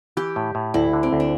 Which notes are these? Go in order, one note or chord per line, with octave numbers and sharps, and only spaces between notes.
E3 G4
A2
A2
D2 E4
D3
C4
D2
D4